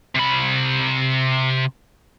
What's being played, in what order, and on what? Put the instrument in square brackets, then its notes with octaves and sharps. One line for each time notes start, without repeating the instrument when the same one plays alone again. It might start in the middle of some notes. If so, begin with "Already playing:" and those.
[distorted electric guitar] C3 B5